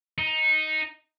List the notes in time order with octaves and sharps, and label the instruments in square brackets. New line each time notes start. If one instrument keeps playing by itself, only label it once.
[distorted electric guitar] D#4